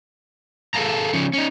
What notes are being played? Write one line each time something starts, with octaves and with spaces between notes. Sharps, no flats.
G#4 A4 C5 F5 A5 A#5
C#3 F3 C#4
C#4 D#4